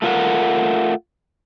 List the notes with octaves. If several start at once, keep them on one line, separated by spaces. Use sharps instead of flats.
A3 F4 A#4 F#5